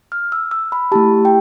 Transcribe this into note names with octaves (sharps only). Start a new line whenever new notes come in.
F6
E6
E6
B5
A3 E4 G4 A5
G5